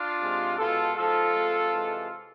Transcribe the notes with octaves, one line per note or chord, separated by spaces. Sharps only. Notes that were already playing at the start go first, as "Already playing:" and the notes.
Already playing: D4 F4
C3 G#3
B2 G#3 F4 A4
G#2 F3 G#3 F4 A4
C3 F3 G#3
C3 E3 G#3